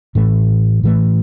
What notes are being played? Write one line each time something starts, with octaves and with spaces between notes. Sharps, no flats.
A2 E3 A3
A2 E3 A3